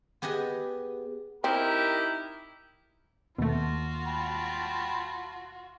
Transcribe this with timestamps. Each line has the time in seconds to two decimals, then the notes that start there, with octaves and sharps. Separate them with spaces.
0.22 B3 G4 G#4 D#5 F#5
1.44 C4 D#4 E4 G4 A#4
3.38 D#2 B2 A3 F4 F#4
4.07 G5 A5 B5